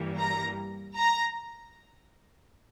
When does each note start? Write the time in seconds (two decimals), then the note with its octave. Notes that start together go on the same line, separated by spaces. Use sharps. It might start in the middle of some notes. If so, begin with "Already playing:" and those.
Already playing: G2 E3 G3 A#3
0.19 A#5
0.98 A#5